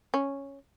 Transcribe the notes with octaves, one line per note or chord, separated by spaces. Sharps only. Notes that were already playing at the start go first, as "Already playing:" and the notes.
C#4